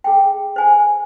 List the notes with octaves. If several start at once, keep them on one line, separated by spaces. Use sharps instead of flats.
G#4 G5
C5 G#5